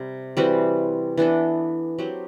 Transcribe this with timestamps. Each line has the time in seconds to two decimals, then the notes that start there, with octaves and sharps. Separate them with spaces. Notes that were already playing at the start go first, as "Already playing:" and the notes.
Already playing: C3 G3 C4
0.37 E3 G3 C4 F#4
1.17 E3 B3 D4 A4
1.99 F#3 C4 G4